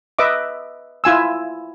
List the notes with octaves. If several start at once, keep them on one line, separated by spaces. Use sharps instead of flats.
B4 D#5 E5 D6
E4 F4 G#5 E6